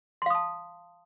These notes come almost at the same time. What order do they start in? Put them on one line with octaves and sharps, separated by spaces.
C6 F5 D#6 A5